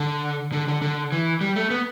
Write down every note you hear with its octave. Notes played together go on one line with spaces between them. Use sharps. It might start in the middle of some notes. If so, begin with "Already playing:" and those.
Already playing: D3
D3
D3
D3
E3
G3
A3
B3